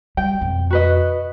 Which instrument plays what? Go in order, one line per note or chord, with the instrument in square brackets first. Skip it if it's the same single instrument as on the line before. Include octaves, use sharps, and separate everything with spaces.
[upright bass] G3 [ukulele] G5
[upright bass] F2 B2
[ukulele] F#4 B4 D#5